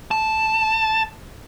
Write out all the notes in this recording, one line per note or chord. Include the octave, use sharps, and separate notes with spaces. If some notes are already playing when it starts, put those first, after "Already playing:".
A5